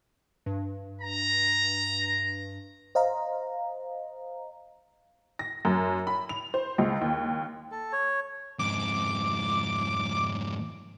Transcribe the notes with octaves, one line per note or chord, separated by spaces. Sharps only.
G2
A#5
C5 D#5 F5 A#5
A#6
F#2
B5
F7
C5
C#2
D#2
A4
C#5
F2 G#2 D6